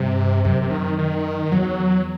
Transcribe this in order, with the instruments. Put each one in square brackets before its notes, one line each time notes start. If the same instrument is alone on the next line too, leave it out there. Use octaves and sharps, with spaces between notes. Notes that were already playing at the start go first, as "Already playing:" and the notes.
Already playing: [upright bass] G2 [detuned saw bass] C3
[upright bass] F#2 [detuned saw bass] C3
[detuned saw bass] C3
D#3
D#3
[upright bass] E2 [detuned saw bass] F#3